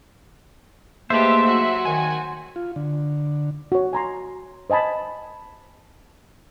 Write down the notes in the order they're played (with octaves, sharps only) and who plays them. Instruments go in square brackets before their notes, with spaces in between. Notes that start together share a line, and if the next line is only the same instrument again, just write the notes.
[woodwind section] G#2 A3 A#3 [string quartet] G4 B4 A5 [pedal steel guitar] C5 [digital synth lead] E5
[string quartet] F#3 F#4
[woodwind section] D#3 [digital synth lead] G#5
[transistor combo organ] F4
D3
[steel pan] F#4 C#5
G#5 A#5 C6
C5 D#5 G#5 A5 B5